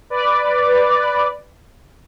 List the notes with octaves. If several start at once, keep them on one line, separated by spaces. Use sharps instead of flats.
B4 D5